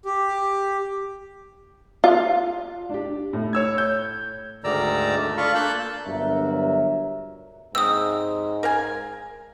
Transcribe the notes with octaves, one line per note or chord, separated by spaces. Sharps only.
G4
F4
D4 G4
A2
C#5 E6 G#6
G6
D2 G#2 D#3 D5 A#5 E6
A3
D4 F4 A4 F5 B5 C#6
A#3 A5 E6 F#6 G6
G1 G2 F#3 A#4 E5
G#2 C3 F#3 D#6 E6
A#4 F5 G#5